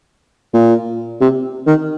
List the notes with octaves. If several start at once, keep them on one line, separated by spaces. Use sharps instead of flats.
A#2
C3
D#3